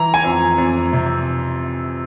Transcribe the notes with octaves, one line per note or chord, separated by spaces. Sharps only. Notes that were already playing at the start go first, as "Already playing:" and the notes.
Already playing: E3 A#5
G#5
F2
F2
C3